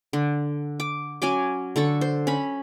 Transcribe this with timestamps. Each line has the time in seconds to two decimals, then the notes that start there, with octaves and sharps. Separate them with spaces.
0.13 D3
0.80 D6
1.22 F#3 C#4 G#5 D6
1.76 D3 A4 C#6
2.01 C5
2.27 C#4 B5